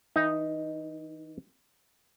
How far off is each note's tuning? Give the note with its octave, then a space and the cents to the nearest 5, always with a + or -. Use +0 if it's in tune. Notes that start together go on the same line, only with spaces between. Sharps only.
E3 -40 D#4 +0 E5 +0